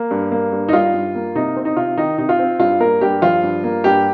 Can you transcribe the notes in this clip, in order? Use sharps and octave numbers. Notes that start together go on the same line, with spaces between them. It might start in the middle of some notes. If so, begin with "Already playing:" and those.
Already playing: A#3
G2
A#3
G2
D#4
G3 F4
G2
A#3
C3 D#4
C4
D#4
C3 F4
D#3 D#4
C3 D#4
F4
C4
G2 F4
A#3 A#4
G2 G4
F3 F4
G2
A#3
G2 G4